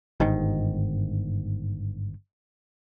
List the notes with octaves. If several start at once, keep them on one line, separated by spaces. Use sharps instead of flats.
G1 G#2 D#3